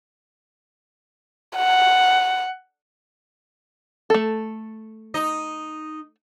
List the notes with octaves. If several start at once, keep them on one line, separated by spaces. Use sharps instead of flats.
F#5
A3 A4
D#4 D#5